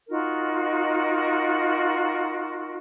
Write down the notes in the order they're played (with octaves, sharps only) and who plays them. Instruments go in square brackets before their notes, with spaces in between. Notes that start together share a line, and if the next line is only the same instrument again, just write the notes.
[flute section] D#4 F4 F#4 A#4